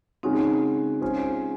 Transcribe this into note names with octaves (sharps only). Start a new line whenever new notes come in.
C#3 G#3 C4 C#4 D#4 F#4
G#3 C#4 F4 G#4 C5